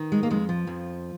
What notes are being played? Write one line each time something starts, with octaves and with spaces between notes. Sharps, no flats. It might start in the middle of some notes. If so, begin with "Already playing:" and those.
Already playing: D#3
G#3
A#3
F2 G#3
F3
F2